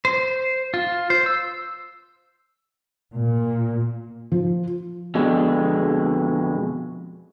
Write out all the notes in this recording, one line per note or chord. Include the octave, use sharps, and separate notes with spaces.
C5
F4
C5
E6
A#2
F3
F2 B2 D3 G#3